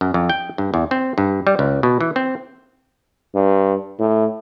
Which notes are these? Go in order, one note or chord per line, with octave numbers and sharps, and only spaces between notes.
F#2
F2
G5
G2
E2
C4
G2
G3
C#2
B2
E3
C4
G2
A2